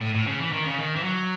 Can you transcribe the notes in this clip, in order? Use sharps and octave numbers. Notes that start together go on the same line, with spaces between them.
A2
A2
C#3
E3
D#3
C#3
D#3
E3
F#3